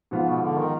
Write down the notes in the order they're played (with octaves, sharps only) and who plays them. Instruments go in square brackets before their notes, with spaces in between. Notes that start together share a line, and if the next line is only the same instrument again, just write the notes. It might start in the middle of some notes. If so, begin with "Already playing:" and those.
[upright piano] G#2 F3 B3 F4
[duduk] B2
D3
D#3